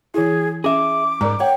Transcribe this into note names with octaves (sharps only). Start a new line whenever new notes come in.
E3 E4 G#4
C#4 G#4 E5 D6
G#2 A#4 D5 A#5
C#5 F#5 G5